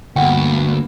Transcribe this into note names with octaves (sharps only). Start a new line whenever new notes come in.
D2 G2 A#3 B3 F#5 G5